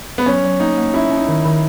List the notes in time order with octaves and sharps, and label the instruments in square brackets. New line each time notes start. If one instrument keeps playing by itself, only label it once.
[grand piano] B3
[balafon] F#3 [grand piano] C#4
[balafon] F#3
[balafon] A#3 [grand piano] D#4
[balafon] A#3
[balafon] C#4 [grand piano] E4
[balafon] C#4
[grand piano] D#4
[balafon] D#3
D#3